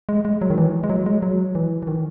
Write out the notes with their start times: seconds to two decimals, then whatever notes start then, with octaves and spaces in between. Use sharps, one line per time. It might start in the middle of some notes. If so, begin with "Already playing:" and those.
0.09 G#3
0.25 G#3
0.41 F#3
0.50 D#3
0.58 E3
0.84 G#3
0.90 F#3
1.06 G#3
1.22 F#3
1.55 E3
1.83 E3
1.87 D#3